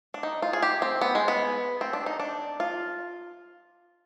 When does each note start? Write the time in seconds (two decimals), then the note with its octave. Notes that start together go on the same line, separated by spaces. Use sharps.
0.14 D4
0.23 D#4
0.42 F4
0.53 G#4
0.62 G4
0.82 C4
1.01 B3
1.15 G#3
1.28 B3
1.81 C4
1.93 D4
2.06 D#4
2.20 D4
2.60 F4